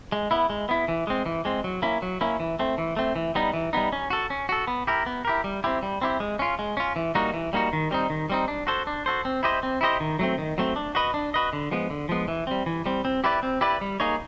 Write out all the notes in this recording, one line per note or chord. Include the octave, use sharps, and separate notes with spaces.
G#3
B3 E4
G#3
B3 E4
E3
G#3 C4
E3
G#3 C4
F#3
A#3 C#4 E4
F#3
A#3 C#4 E4
E3
A3 C4
E3
A3 C4
E3
G3 B3 D#4
E3
G3 B3 D#4
C#4
F#4 A4
C#4
F#4 A4
B3
E4 G4 A#4
B3
E4 G4 A#4
G3
C4 E4 G4
G3
C4 E4 G4
G#3
C#4 F4
G#3
C#4 F4
E3
G3 A#3 D#4 F#4
E3
G3 A#3 D#4 F#4
D#3
G3 C4 D#4
D#3
G3 C4 D#4
D4
F#4 A4 C5
D4
F#4 A4 C5
C4
E4 G4 C5 D#5
C4
E4 G4 C5 D#5
D#3
F#3 A3 C4
D#3
F#3 A3 C4
D4
F#4 B4 D#5
D4
F#4 B4 D#5
D3
F3 G#3 B3
D3
F3 G#3 B3
E3
G3 C4
E3
G3 C4
C4
E4 G4 B4 D5
C4
E4 G4 B4 D5
G3
A#3 D#4 G#4 C#5